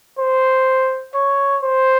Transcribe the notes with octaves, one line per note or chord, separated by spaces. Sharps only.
C5
C#5
C5